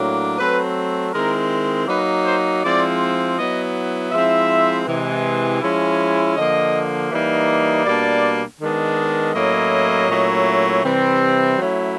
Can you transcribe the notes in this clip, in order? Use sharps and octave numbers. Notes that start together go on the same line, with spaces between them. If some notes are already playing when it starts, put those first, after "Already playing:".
Already playing: A2 F#3 A#3 D4
F#3 A3 C4 B4
D#3 G#3 C4 E4 A#4
F#3 A#3 D#4 B4
C5
F3 G#3 C4 E4 D5
F#3 B3 E4 D#5
F3 G#3 C4 E4 E5
C3 E3 G#3
F3 G#3 C#4 E4
D3 F3 A#3 D#5
E3 G3 A#3 D#4
B2 G3 A#3 D4 D5
D#3 G#3 B3 D4
A2 F#3 A#3 C#4 E4 D#5
A#2 F#3 A3 C#4 E4
C3 E3 G3 C4
F#3 A3 C#4 E4